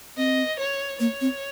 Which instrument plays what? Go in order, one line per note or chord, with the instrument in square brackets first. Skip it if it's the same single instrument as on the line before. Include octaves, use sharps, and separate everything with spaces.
[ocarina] C4 [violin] D#5
[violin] C#5
[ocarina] A#3 [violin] C#5
[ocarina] C4